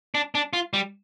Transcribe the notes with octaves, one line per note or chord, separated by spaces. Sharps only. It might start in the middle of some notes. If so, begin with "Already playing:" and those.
D4
D4
F4
G3